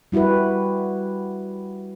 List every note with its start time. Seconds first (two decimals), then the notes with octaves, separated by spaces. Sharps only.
0.12 G3 E4 F#4 G4 B4